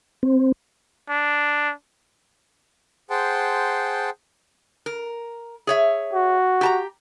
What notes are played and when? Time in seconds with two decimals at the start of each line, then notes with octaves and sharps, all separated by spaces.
0.23 C4
1.09 D4
3.10 G#4 C5 F#5 G5 A5 C6
4.86 A#4
5.67 G#4 C#5 E5
6.14 F#4
6.61 G4 A5 A#5